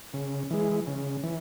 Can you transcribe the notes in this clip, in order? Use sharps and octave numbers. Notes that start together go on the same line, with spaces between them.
C#3
E3 G#3
C#3
E3